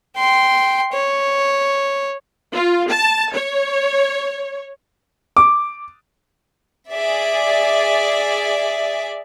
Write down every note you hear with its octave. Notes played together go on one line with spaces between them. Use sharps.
G5 C6
C#5
F4
A5
C#5
D6
G#4 D5 E5